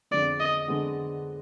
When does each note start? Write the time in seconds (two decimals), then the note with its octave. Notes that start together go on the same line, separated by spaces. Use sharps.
0.11 F2 D3 G#3 B3 D5
0.40 D#5
0.68 D3 G#3 B3